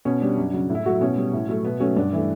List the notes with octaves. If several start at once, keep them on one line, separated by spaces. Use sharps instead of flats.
B2 C#4
G3 D4
F#2
C#3 F#3
A2
E4
F#3 A3 F#4
B2 C#4
G3
A2
F#3 A3
B2 B3
F#3 A3 C#4
G2 D4
E3 A3